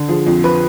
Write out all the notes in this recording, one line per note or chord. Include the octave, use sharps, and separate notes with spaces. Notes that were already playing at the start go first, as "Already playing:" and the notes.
Already playing: D3
F3 G#4
F2
F3 B4